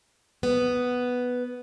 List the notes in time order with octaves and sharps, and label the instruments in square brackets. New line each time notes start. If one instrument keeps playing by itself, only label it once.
[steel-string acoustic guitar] B3